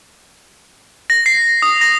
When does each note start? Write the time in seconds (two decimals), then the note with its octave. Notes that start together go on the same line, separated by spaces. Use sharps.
1.10 A#6
1.26 C7
1.62 D#6
1.81 A#6